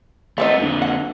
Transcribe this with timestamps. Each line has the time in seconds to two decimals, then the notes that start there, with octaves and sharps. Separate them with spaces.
0.38 E3 A3 B3 C4 D#4
0.59 F2 D3
0.82 F#5